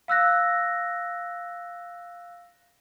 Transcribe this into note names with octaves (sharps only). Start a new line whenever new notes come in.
F5 E6 F#6 A#6